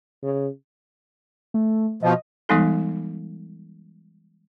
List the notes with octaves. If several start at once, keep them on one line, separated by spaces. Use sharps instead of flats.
C#3
A3
B2 F3 D#5
E3 G3 G#3 B3 D#4 A4